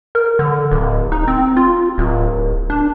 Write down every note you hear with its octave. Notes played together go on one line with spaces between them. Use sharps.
A#4
D3
D1
D#4
C4
F4
D1
D4